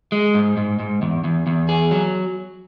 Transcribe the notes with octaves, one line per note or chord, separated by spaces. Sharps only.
G#3
G#2
G#2
G#2
E2
E2
E2
G#4
F#3